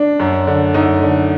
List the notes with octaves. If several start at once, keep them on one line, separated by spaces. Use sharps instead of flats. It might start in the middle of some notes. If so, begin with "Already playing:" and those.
Already playing: D4
F#2
D3
F#2 D#4
D3